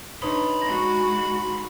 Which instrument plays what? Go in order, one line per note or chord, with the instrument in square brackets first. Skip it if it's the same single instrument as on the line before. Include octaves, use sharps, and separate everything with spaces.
[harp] D4 D#4 C#5 [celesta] B4 D#6 [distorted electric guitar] B5 C6
[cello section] G#3 F#4 [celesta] A#6